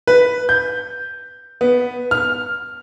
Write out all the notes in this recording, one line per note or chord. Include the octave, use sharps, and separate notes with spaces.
B4
G6
B3
F6